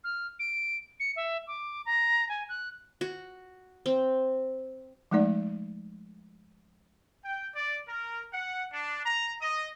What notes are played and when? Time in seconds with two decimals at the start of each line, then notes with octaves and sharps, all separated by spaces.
0.04 F6
0.39 D7
1.00 C#7
1.16 E5
1.47 D6
1.86 A#5
2.29 G#5
2.49 F#6
3.01 F#4
3.86 C4
5.11 F3 G#3 A3 D#4 D5
7.24 G5
7.55 D5
7.87 A#4
8.33 F#5
8.72 D4
9.05 A#5
9.41 D#5